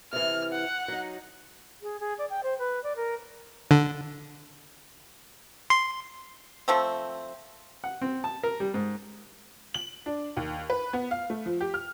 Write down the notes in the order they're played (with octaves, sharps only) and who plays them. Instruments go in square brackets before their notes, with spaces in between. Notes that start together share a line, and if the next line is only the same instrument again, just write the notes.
[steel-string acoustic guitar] C3 E3 [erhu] F6
[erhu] F#5
[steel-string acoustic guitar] F#3 D#4
[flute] G#4
G#4
D5
G5
C5
B4
D5
A#4
[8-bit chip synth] D3
C6
[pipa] F3 A3 C4
[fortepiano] F#5
C4
A5
A#4
G3
G#2
[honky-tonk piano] F#7
D4
D#2
B4
B3
F5
A3
F3
G4
F6